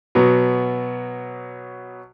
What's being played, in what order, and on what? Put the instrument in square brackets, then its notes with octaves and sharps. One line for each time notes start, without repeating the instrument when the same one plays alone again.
[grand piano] B2 F#3 B3